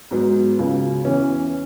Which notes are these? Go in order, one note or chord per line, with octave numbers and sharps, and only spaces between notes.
G#2 F#3 B3
C#2 C#3 F#3 B3
E2 E3 B3 C#4